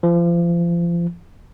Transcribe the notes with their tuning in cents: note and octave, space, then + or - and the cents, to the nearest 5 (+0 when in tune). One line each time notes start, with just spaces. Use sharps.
F3 -30